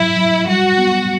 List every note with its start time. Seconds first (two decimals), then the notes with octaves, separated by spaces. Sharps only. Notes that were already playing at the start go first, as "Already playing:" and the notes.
Already playing: F#3 E4
0.17 F#3
0.47 G3 F#4
0.78 B3